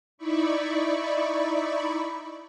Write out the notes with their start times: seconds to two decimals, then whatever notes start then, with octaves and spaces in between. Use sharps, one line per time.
0.17 D#4 E4 D5 B5 C#6